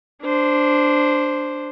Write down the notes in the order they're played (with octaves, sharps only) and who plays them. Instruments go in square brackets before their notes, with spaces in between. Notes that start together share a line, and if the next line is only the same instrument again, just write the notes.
[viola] D4 C5